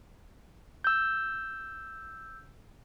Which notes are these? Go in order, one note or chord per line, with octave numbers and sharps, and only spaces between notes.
E6 G6